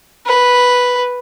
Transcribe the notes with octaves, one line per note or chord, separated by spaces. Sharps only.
B4